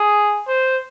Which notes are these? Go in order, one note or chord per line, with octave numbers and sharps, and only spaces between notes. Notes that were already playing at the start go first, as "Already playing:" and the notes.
Already playing: G#4
C5